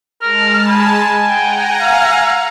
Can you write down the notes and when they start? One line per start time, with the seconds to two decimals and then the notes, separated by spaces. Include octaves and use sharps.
0.22 G#3 A#4 A5 F6
0.69 G#5 B5
1.28 F#5 G5 A#5
1.81 F5